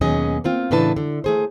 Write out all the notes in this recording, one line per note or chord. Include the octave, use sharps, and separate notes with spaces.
D#2 B2 F#3 C#4 G#4 D#5
A#3 C4 F4
A2 C#3 E3 D4 B4 A5
D3
A3 G#4 C5